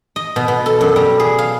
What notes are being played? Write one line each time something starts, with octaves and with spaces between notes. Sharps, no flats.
D#5
B2
B2
A4
F#2
G3
G#4
F5